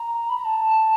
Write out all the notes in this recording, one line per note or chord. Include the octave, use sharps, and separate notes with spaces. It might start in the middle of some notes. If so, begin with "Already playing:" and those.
Already playing: A#5
B5
A#5
A5